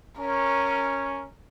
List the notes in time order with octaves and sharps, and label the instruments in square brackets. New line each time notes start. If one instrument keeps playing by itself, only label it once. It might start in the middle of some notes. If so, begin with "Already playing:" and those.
[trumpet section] C#4 [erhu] A#4